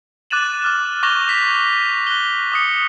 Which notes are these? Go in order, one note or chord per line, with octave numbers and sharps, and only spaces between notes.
D6 F#6 A6 D#7 E7 F#7
D6 F6 E7
C#6 D6 G6 A#6 F7 G7
F#6 B6 F7
F#6 G7
D6 D#6 C#7